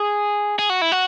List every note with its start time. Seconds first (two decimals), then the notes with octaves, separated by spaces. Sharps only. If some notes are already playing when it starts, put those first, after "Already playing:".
Already playing: G#4
0.59 G#4
0.70 F#4
0.82 E4
0.92 F#4